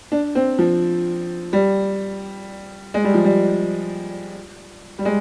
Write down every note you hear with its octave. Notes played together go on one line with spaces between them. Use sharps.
D4
C4
F3
G3
G#3
G3
F3
G3
G3
G#3